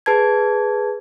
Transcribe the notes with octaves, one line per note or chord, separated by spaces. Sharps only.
G#4 B4 A5 G#6